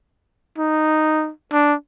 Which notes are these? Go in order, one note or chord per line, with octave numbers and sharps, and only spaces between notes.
D#4
D4